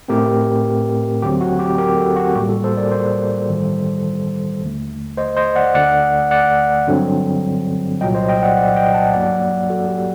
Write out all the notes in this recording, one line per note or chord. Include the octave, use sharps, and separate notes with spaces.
A2 A3 C4 G4 A#4
D2 D3 F#3 C4 G4
F#4
G4
G4 A#4
F#4 A4
F#4
A1 A2 G3 A#3 G4
F#4 A4
A4 C5
A#4 D5
A4 C5
A1 G2 D#3 G3
D#2 D3 A3
C5 D#5
C5 D#5
D5 F#5
D2 D3 A3 D5 F#5
D5 F#5
G2 D3 F#3 C4
C2 A#2 F#3 D#5 G5
C5 D#5
D#5 G5
D5 F#5
D5 F#5
D#5 G5
F#5 A5
G2 F#3 A#3 D5 F#5
F#4 A4
G4